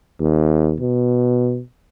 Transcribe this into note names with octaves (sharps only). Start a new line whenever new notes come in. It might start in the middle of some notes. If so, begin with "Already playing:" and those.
D#2
B2